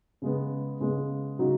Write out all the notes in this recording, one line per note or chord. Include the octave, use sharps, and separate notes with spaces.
C#3 G#3 B3
C#3 G#3 B3
C#3 F#3 D#4 F#4